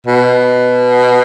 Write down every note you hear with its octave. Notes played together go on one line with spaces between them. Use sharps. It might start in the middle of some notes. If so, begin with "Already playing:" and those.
B2